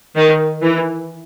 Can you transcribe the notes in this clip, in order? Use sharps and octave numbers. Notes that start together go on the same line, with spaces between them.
D#3
E3